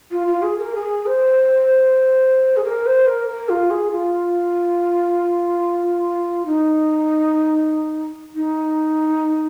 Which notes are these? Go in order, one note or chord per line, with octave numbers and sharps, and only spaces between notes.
F4
F4
G#4
A#4
G#4
C5
G#4
A#4
C5
A#4
A#4
F4
G#4
F4
D#4
D#4